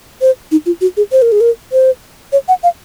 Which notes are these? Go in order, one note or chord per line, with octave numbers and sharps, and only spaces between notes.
C5
D#4
F4
F#4
G#4
C5
A#4
G#4
A#4
C5
C#5
F#5
F5